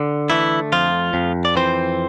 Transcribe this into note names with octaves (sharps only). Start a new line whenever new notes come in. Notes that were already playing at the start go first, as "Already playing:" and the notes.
Already playing: D3
E3 A3 E4
F2 F3 F4
F2
D5
E3 C4 C5